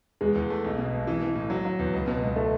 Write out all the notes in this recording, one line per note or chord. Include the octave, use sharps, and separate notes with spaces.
E2 G#3
E2
A3
B1
B2
B1
E3
E3
A2
F#3
F#3
E2
C#2
B2
C#2
A3